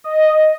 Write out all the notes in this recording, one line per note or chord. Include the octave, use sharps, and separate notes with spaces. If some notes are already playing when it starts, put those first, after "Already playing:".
D#5